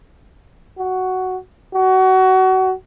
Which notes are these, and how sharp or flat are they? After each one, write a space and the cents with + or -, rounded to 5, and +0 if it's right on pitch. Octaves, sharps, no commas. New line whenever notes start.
F#4 +5
F#4 +25